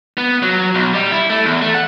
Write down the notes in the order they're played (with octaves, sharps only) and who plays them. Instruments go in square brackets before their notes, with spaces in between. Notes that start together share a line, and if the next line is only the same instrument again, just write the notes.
[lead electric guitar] B3
F#3
B1
G3
E4
A3
E2
A3
F#5